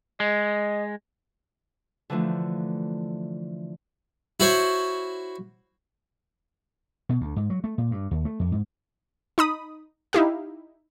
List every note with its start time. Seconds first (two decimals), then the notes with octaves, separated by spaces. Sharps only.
0.20 G#3 D#5
2.10 D3 E3 F3 A3
4.40 E4 F#4 C5 C#5
7.09 B2
7.21 D2
7.36 G#2
7.50 F#3
7.64 A3
7.78 A#2
7.91 G2
8.11 D#2
8.25 A3
8.40 F2
8.52 G#2
9.38 D#4 B5 D#6
10.13 D#4 E4 G4 F5